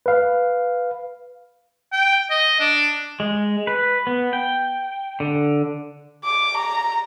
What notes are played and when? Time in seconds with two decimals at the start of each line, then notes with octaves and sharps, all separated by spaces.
0.06 B4 F5
1.92 G5
2.30 D#5
2.60 D4
3.20 G#3
3.67 B4
4.07 B3
4.33 G5
5.20 D3
6.24 D6
6.57 A#5